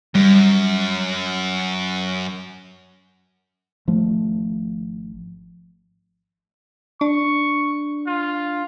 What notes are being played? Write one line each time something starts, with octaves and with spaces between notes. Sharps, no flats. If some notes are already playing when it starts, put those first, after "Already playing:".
F#2 G3
G#1 F3 A3
D4 C#6
F4